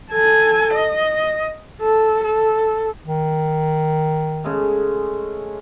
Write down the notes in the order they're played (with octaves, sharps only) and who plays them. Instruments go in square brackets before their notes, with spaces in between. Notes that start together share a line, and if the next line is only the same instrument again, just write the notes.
[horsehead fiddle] A4 G#5
D#5
A4
A4
[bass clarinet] D#3
[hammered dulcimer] C#3 G#3 A3